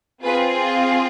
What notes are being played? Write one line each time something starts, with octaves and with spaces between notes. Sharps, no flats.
C4 F4 G#4 B4